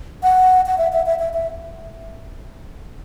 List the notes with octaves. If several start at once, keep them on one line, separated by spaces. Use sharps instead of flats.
F#5
F#5
E5
E5
E5
E5
E5